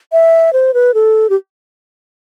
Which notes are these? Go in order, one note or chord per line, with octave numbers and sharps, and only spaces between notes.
E5
C5
B4
A4
G4